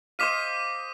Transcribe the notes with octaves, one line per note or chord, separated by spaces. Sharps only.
C5 D#5 F5 D6 B6 D#7